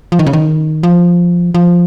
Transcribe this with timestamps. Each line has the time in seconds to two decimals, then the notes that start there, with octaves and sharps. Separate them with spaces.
0.12 F3
0.19 D#3
0.26 C#3
0.33 D#3
0.83 F3
1.54 F3